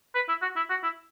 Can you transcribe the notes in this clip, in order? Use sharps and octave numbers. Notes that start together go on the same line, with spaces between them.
B4
E4
F#4
E4
F#4
E4